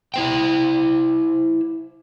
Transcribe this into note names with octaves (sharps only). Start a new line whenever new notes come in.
E4 C5 G5